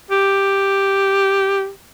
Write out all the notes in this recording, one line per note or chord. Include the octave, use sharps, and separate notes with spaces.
G4